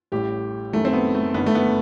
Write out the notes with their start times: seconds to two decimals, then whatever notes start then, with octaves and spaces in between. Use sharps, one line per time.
0.12 A1 A2 G3 G4
0.73 F#1 F#2 D#3 G3 A3
0.85 C4
0.93 B3
1.15 A3
1.34 G1 G2 D#3 B3
1.46 A3
1.55 B3